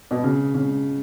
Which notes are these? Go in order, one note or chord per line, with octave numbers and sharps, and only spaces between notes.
B2
C#3
C#3